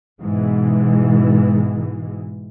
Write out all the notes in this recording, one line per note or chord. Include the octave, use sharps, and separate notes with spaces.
G#2 B2 E3 G#3